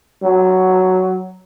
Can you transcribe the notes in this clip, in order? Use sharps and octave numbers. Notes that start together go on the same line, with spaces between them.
F#3